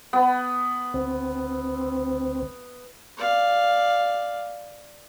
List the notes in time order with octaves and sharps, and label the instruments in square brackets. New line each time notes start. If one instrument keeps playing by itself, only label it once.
[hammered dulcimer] B3
[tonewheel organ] D2 C4
[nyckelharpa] D5 F5